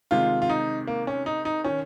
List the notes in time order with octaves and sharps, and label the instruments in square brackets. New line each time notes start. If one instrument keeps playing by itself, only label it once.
[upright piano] C3 D#3 G#3 [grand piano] F4
[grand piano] F4
D#4
A#3
C#4
D#4
D#4
[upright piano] D#3 [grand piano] C#4